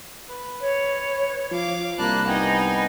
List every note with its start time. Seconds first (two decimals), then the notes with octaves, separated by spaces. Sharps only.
0.29 B4
0.61 C#5
1.51 F3 F5 D6
1.98 C2 A#3 D4 A5 B5 F#6
2.27 B3 D#4 D#5 G5 G#5